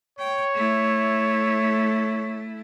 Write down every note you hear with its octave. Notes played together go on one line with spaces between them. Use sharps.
C#5 G5
A3 E4